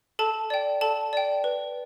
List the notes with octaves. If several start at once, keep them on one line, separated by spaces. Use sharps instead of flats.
A4 A5
D5 G5
A4 A5
D5 G5
B4